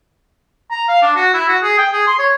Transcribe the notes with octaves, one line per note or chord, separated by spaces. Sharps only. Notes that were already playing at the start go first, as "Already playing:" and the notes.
A#5
F5
D4
F#4
E4
F#4
G#4
G5
G#4
C6
C#5